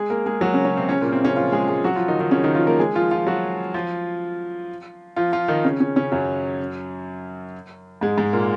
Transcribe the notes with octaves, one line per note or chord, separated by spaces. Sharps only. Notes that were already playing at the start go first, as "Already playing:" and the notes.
Already playing: G#3 G#4
A#3 A#4
G#3 G#4
F#3 F#4
C#3 C#4
C#3 C#4
C3 C4
C#3 C#4
A#2 A#3
C3 C4
C#3 C#4
F3 F4
G#3 G#4
G#3 G#4
F#3 F#4
F3 F4
D#3 D#4
D#3 D#4
C#3 C#4
D#3 D#4
F3 F4
A#3 A#4
G#3 G#4
F3 F4
F3 F4
F#3 F#4
F3 F4
F3 F4
F3 F4
D#3 D#4
C#3 C#4
C#3 C#4
C#3 C#4
F#2 F#3
G#2 G#3
G#2 G#3
A#2 A#3